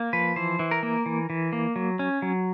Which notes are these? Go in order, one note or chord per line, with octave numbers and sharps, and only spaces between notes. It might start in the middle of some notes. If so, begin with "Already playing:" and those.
Already playing: A#3
F3 B4
E3 C5
E3
A#4
A#3
E3
E3
A#3
F#3
C#4
F#3